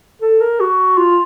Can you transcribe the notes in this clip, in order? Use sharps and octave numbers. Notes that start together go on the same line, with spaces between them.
A4
A#4
F#4
F4